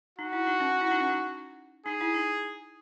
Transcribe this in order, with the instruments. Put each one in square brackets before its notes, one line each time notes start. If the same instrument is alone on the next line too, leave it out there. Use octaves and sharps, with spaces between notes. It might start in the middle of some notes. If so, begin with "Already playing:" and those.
[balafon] D#4 [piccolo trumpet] F#4
[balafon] E4
D#4
C#4
E4
D#4
C#4
D#4
[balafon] D#4 [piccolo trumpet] G#4
[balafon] E4
D#4